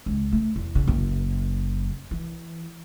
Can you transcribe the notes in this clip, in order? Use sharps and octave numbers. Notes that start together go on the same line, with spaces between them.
C#2
A3
E2
C#3
F#1 F#2
E3